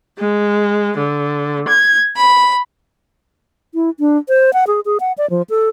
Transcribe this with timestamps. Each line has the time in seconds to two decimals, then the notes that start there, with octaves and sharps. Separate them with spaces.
0.17 G#3
0.97 D3
1.67 G#6
2.16 B5
3.74 E4
4.00 D4
4.29 C5
4.53 F#5
4.67 G#4
4.85 G#4
5.00 F#5
5.18 D5
5.30 F3
5.50 A4